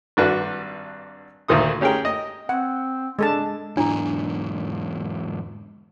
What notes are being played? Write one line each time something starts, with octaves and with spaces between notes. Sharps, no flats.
G#1 G2 D4 F#4 B4 A5
D2 A#2 D#3 C5 D#6
C#4 G4 G#4 A#4 G5
D#5
C4 F#5
G#3 D4 A4 A5
E2 G#2 D4 E4